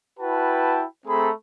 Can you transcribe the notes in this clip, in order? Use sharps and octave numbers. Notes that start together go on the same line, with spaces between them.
E4 F#4 B4 G5 A5
A3 C4 G#4 A4 A#5 B5